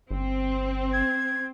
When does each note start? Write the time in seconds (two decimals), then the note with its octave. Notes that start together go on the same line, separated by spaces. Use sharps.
0.11 G1 C4
0.93 G#6